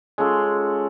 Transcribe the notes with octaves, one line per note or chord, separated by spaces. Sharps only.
G#3 C#4 F4 A4